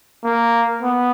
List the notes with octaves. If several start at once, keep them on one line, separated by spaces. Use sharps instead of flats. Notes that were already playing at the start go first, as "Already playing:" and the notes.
A#3
B3